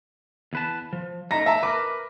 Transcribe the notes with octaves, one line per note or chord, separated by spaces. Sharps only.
E2 B4 A5
F3
A3 D#4 A#5 A#6
E5 A5 A#5
A#4 B4 D6